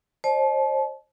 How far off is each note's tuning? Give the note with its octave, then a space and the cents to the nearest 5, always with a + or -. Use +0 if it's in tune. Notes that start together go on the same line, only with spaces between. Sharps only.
C5 +35 D#5 -45 A5 -35